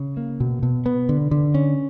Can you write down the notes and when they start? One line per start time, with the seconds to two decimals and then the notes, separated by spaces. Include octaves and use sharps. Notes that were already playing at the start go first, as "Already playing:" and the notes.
Already playing: C#3
0.17 A#3
0.40 B2
0.63 B2
0.86 B3
1.09 D3
1.31 D3
1.54 C#4